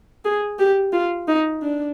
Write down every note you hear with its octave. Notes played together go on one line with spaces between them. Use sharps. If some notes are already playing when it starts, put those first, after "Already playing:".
G#4
G4
F4
D#4
D4